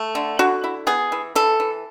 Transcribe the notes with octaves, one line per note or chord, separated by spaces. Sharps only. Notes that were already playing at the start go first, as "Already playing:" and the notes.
Already playing: A3
D3
D3 F#4
E4
B3 G#4
E3
E3 A4
E3